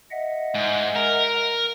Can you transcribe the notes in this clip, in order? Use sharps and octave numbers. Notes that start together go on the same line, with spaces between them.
D#5 E5 F#5
G#2
A#4